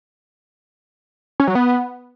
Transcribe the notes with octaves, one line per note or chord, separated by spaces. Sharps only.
C#4
F#3
B3